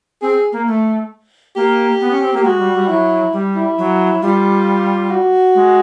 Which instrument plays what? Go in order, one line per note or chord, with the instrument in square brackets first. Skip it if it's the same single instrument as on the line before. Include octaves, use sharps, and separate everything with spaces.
[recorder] C4 [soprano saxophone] G#4
[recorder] A#3
A3
[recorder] A#3 [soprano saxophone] G4
[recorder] B3
C#4
C4
A#3
[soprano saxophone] G4
[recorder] G#3 [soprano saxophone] F#4
[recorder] G3
G3
[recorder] F#3 [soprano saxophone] E4
[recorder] G3
[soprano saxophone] E4
[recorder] F#3
[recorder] G3 [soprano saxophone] F4
[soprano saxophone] F#4
[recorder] G#3